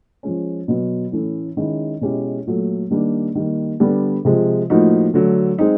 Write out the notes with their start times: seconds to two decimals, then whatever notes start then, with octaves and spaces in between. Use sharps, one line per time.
0.23 F3 G#3 C#4
0.68 B2 F#3 B3
1.12 A2 E3 A3 C#4
1.57 D#3 G#3 C#4 E4
2.01 B2 G#3 C#4 E4 G4
2.46 A#2 F#3 A3
2.91 D#3 G3 A#3 D4
3.35 D#3 G3 A#3
3.80 D3 G3 B3 D4
4.25 C3 F3 G#3
4.70 A2 F3 A#3 D#4 F#4
5.14 D3 F#3 A3
5.58 G#3 C4 D#4